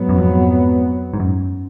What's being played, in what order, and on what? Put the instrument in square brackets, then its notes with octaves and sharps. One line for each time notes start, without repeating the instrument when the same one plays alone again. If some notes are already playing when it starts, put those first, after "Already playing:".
Already playing: [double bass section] G#2 F#3 B3
[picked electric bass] F#2
F2
G#2
F#2